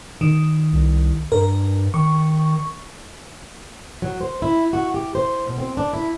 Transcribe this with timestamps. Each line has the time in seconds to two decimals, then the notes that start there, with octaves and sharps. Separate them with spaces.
0.21 D#3
0.73 C2
1.32 G2 A#4
1.94 D#3 C#6
4.02 F#3
4.21 C5
4.42 E4
4.73 F#4
4.94 G4
5.15 C5
5.47 B2
5.58 C4
5.77 D4
5.93 E4